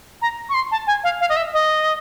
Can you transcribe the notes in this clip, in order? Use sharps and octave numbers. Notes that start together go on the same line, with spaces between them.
A#5
C#6
C6
A5
G#5
F5
F5
D#5
E5
D#5